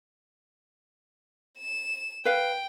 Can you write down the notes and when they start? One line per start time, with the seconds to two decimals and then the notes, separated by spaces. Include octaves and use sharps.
1.58 E7
2.25 B4 F5 G5